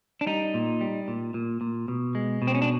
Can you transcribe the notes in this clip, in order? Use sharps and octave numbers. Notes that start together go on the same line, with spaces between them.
D4
G3 D#4
A#2
G3
A#2
A#2
A#2
B2
G#3
B2
C4
C#4
D4